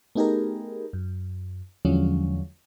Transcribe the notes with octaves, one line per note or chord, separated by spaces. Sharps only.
A3 B3 D#4 G4 G#4 A#4
F#2
E2 D3 F3 F#3 G#3 C#4